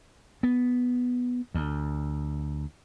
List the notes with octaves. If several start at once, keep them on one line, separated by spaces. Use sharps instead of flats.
B3
D2